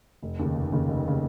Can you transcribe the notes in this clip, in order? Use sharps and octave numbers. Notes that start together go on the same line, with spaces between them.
F1
D#2 C#3
F1
D#2 C#3
F1
C#3